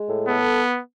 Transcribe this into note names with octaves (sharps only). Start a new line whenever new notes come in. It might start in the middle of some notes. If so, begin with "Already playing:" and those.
Already playing: G#3
A2
B3 A4